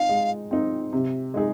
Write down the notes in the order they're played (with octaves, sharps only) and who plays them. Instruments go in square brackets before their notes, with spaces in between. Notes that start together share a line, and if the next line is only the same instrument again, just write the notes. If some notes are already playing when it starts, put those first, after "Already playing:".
Already playing: [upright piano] C4 D#4 [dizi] F5
[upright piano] G#3
C4 D#4
C3
G#3 D#4 G#4